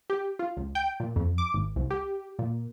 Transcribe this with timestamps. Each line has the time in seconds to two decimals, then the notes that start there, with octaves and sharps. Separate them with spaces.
0.10 G4
0.39 F4
0.57 C#2
0.75 G5
1.00 A#2
1.16 F2
1.38 D6
1.54 G#1
1.76 C2
1.91 G4
2.39 A#2